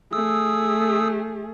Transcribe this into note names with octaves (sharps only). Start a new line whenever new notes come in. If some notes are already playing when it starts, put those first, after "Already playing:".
A3 G#4 D#6 E6